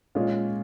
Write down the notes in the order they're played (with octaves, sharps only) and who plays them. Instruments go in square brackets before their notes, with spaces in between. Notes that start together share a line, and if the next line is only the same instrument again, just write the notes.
[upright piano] A#2 G#3 C#4 [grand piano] F4